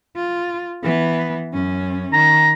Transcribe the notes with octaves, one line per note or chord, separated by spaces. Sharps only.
F4
E3 B3
F#2 C#4
D#3 A#5